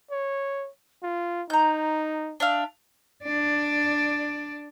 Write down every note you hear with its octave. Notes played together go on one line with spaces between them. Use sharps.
C#5
F4
D#4 A#5 G6
D4 E5 F5
D4 D5